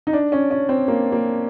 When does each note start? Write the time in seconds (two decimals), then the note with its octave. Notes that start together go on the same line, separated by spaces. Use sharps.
0.07 D#4
0.13 D4
0.32 C#4
0.51 C#4
0.69 C4
0.88 A#3
1.12 A#3